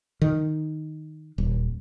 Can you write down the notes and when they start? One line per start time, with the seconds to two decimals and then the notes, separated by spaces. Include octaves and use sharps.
0.22 D#3
1.38 D#1